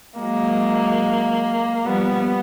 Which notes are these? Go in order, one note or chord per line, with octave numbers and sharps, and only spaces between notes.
F#3 G#3 A#3
F3 G3 B3